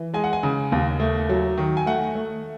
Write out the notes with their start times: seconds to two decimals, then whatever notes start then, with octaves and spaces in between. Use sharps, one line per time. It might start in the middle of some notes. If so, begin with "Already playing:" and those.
Already playing: E3
0.14 G#3 G#5
0.24 F#5
0.33 G#5
0.43 C#3
0.72 D#2
1.00 A3
1.29 F#3
1.57 D#3
1.77 G#5
1.86 A3 F#5
2.15 A3